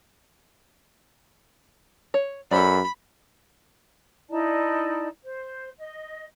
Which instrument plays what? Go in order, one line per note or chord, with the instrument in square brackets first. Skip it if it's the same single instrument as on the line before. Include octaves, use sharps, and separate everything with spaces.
[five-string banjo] C#5
[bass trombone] F#2 [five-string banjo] A4 C5 D5 [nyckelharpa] B5
[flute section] D#4 E4 D5 A5
C5
D#5